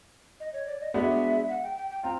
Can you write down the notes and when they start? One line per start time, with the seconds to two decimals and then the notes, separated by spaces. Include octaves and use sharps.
0.40 D#5
0.53 C#5
0.67 D5
0.81 D#5
0.94 G#3 B3 D4 F#4 E5
1.49 F#5
1.63 G5
1.77 G5
1.90 G5
2.03 C4 F4 A#5